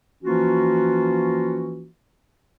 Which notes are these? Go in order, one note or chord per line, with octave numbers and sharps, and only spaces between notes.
E3 F3 A#3 C#4 F4 F#4